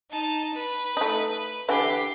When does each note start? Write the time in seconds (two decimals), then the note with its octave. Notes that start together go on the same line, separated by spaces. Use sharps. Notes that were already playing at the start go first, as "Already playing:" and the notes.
0.11 D#4 A5
0.54 B4
0.97 A3 D#4
1.69 D3 E3 E4 G4 C7